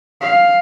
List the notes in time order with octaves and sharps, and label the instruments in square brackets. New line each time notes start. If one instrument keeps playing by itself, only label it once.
[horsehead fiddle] F5